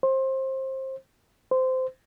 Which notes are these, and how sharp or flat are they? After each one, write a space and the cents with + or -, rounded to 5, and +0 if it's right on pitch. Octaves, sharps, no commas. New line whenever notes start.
C5 +25
C5 -15